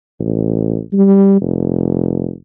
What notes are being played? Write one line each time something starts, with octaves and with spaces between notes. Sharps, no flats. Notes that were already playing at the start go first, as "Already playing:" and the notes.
A1
G3
F1